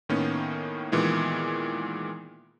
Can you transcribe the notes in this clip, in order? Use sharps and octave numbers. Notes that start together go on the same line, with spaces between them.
A2 D#3 A#3 B3 C#4
A#2 D#3 E3 G#3 B3